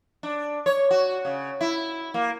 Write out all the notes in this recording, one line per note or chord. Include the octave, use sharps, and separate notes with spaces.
D4
C#5
F#4
C#3
E4
A#3